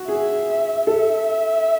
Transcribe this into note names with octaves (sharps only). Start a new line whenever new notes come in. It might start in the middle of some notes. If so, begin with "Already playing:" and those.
Already playing: F#4
G#4 E5
A4 E5